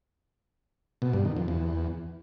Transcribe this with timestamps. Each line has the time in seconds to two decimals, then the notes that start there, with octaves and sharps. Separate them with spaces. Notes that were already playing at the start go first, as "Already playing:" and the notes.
1.02 B2
1.13 G2
1.25 D#3
1.37 F2
1.48 E2